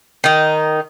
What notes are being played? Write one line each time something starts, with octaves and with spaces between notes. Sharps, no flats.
D#3 D#4